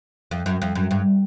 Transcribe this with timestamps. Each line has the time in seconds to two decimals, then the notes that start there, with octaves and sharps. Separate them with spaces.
0.31 F2
0.46 F#2
0.62 F2
0.75 F#2
0.91 G2